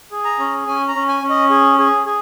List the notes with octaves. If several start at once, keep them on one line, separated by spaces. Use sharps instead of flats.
G#4
A#5
C#4
C#4 G#5
A#5
C#4
G#5
C#4
D#5
G#4
G#4
G#4